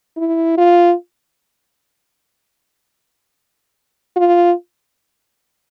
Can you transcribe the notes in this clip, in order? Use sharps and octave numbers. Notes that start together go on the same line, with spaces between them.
E4
F4
F4